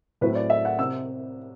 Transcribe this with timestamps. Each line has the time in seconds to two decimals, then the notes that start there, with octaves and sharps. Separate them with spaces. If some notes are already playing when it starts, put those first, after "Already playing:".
0.21 A2 F#3 C4 E4 B4
0.35 D5
0.50 E5
0.65 F#5
0.79 C3 E6